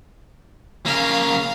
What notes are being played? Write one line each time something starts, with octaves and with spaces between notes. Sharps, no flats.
C#3 A#3 F5